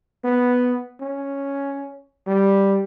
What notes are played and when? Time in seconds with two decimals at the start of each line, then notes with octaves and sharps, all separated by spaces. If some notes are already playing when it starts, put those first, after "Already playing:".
0.24 B3
1.00 C#4
2.27 G3